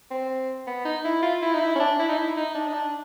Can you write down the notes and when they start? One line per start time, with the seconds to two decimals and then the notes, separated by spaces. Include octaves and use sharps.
0.11 C4
0.67 B3
0.85 D#4
1.05 E4
1.23 F4
1.42 E4
1.54 D#4
1.61 E4
1.75 C#4
1.80 D4
1.99 E4
2.09 D#4
2.18 E4
2.37 D#4
2.55 D4
2.68 D#4
2.73 D4